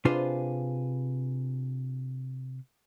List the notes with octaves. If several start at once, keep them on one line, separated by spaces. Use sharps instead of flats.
C3 D4 F4 G#4 B4 C5